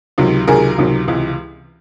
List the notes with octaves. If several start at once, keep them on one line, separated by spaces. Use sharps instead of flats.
C#2 C3 D#3 F#3
C#2 C3 D#3 F#3 G#4 A#4
C#2 C3 D#3 F#3
C#2 C3 E3